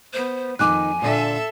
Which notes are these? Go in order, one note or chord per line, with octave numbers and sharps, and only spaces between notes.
B3 C5
F2 D#3 A#3 D#4 G#5 D6 F#6
A#2 D3 D4 A4 E5